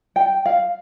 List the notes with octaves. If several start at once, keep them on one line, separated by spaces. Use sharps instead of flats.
G5
F5